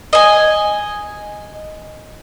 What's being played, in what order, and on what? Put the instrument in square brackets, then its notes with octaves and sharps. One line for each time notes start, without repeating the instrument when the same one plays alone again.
[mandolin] D#5 G#5